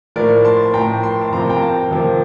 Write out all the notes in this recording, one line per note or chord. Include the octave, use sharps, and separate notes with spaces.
A2 F3 A#3 A#4 D5
A5 C6
A2 F3 A#3 G5 A#5
C6
A5 C6
F2 C3 F3 A#3 A#5
A5
G5 A#5
F5 A5
F2 C3 F3 A#3